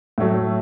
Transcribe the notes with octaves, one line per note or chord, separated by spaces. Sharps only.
A2 F#3 A3